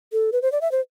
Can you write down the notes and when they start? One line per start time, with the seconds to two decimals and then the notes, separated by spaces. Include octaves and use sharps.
0.13 A4
0.32 B4
0.42 C5
0.52 D5
0.61 E5
0.72 C5